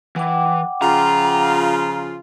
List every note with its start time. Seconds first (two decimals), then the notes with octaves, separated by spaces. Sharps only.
0.16 E3 F#5 G5 D6
0.82 C#3 F3 F4 A#5